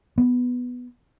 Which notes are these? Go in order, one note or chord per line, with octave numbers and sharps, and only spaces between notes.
B3